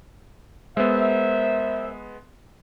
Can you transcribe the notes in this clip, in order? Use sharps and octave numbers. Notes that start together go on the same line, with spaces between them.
G#3 B3 A#4 C5 E5